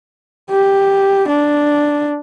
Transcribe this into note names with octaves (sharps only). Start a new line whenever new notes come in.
G4
D4